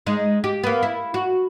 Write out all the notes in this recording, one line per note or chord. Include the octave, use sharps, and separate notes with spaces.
G#3 D#4
G4
A#3 B3
E4
F#4